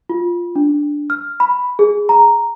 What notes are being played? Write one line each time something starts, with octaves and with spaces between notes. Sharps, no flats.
F4
D4
F6
B5
G#4
A#5